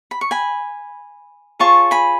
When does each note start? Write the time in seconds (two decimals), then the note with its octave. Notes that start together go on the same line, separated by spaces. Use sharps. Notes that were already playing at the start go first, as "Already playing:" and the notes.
0.11 B5
0.21 C#6
0.31 G#5 B5
1.59 F4 G#4 C#5 A5 C#6
1.91 G#5 B5